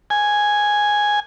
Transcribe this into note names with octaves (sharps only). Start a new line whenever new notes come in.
G#5